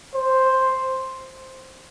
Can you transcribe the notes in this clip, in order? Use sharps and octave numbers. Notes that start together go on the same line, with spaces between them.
C5